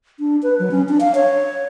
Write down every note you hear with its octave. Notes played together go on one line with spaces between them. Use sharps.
D4
B4
F#3
C#4
D4
F5
C#5